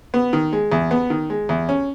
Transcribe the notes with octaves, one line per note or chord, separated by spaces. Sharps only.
B3
D#3
G#3
E2
B3
D#3
G#3
E2
C#4